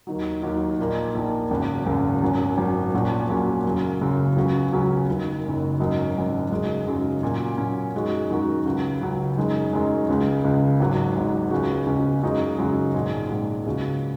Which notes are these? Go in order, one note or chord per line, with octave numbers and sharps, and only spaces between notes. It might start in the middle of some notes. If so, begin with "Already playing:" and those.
D#2 D#3 F#3
D#2 D#3 F#3
A#1 A#2 A#3 D#4
A#1 A#2 A#3 D#4
G#1 F#2 C#3
G#1 F#2 C#3
G#1 F#2 F#3 C#4
G#1 F#2 F#3 C#4
A#1 A#2 F#3 C#4 F#4
A#1 A#2 F#3 C#4 F#4
F#1 F#2 C#3 F#3
F#1 F#2 C#3 F#3
C#2 C#3 F#3 C#4 F#4
C#2 C#3 F#3 C#4 F#4
F#1 F#2 D#3
F#1 F#2 D#3
G#1 F#2 F#3 D#4
G#1 F#2 F#3 D#4
F#2 C#3 G#3 D#4 F#4
F#2 C#3 G#3 D#4 F#4
A#2 F#3 C#4
A#2 F#3 C#4
F#2 D#3 G#3 F#4
F#2 D#3 G#3 F#4
C#2 C#3 F#3
C#2 C#3 F#3
F#2 D#3 G#3
F#2 D#3 G#3
C#2 C#3 G#3
C#2 C#3 G#3
G#1 G#2 F#3
G#1 G#2 F#3
C#2 C#3 G#3 C#4 F#4
C#2 C#3 G#3 C#4 F#4
F#2 C#3 G#3 D#4 F#4
F#2 C#3 G#3 D#4 F#4
A#1 G#2 G#3
A#1 G#2 G#3
C#2 C#3 G#3 F#4